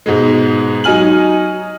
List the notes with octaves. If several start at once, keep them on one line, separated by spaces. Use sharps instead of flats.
G#2 B2 G#3
F#3 D#4 G#5 F6 F#7